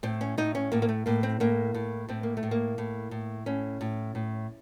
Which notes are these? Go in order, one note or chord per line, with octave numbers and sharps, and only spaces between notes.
A2 C4
C#4
A2 D#4
C#4
A2 A#3
A#3
A3
A2 A#3
C4
A2 A#3
A2
A2 C4
A#3
A3
A2
A#3
A2
A2
A2 C#4
A2
A2